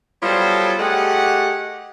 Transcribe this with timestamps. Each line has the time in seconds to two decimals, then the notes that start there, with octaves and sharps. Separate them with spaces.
0.22 F#3 G3 B3 F4 A4 C5
0.80 A3 G4 G#4 D#5 F#5